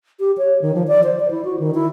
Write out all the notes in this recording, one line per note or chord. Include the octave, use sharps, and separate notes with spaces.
G4
C#5
D#3
F3
D5
C5
D5
E4
F#4
D#3
E4